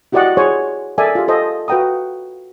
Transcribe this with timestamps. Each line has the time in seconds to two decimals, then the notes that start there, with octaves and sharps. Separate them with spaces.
0.12 E4 F#4 G4 D5 D#5 F#5
0.37 E4 G#4 C5 C#5 F#5 G#5
0.98 A4 A#4 D5 E5 G#5
1.15 F4 G4
1.28 A4 C5 D#5
1.68 F#4 B4 F5 G5 A#5 D#6